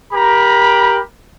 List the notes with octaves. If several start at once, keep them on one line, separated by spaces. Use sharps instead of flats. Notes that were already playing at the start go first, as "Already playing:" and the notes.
G4 A#4 A#5 B5